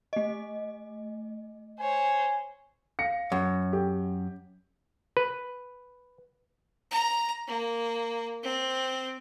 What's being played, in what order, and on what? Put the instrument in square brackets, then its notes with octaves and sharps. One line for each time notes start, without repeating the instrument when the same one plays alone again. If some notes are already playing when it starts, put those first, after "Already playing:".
[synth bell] A3 D#5
[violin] C5 C#5 [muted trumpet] G#5
[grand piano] F5 A#6 C#7
[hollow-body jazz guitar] F#2 [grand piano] F#5
[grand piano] G4
[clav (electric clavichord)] B4
[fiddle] A#5
A#3
C4